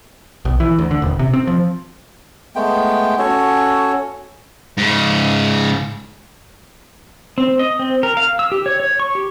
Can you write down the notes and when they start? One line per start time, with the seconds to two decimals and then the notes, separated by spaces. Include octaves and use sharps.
0.45 B1
0.60 E3
0.78 D2
0.91 D3
1.02 D#1
1.19 C3
1.34 C4
1.47 F3
2.56 G#3 A3 B3 G5
3.19 C#4 F#4 A4 C#5
4.77 G#2 C#3
7.38 C4
7.59 D#5
7.79 C4
8.03 A#4
8.17 F5
8.39 E6
8.52 G4
8.66 C#5
8.80 C#5
9.00 C#6
9.15 G4